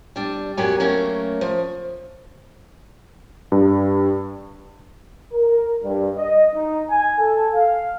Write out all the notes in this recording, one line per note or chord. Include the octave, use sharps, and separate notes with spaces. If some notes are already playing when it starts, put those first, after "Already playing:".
G3 D4
F#2 B2 F#3 G4 G#5
F#3 A3 A#3 C#4
F3
G2
A#4
G2
D#5
D#4
G#5
A4
F5